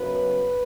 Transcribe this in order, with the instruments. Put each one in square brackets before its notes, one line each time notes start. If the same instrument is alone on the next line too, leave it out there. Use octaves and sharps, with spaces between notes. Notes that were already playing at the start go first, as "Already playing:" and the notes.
Already playing: [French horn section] F#2 C#3 F#3 B3 B4